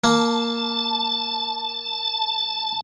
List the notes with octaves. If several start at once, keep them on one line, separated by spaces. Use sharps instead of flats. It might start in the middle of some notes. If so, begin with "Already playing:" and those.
A#3 A5